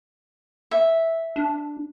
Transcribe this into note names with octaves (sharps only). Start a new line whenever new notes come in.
E5
D4